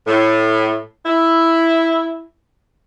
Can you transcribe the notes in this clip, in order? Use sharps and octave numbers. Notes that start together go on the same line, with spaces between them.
A2
E4